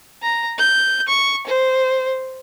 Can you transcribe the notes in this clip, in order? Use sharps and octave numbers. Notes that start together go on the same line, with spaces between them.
A#5
G6
C#6
C5